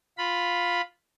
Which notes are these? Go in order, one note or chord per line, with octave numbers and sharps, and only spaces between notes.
F4 B5